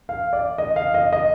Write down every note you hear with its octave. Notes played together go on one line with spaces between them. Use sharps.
F5
D5
D#5
F5
D#5
D#5